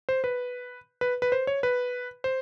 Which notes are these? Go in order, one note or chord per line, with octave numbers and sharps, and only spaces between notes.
C5
B4
B4
B4
C5
C#5
B4
C5